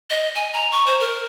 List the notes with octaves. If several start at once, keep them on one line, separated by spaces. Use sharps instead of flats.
D#5
G#5
A#5
C#6
C5
A#4